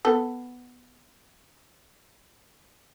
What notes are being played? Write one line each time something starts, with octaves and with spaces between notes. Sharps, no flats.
B3 A4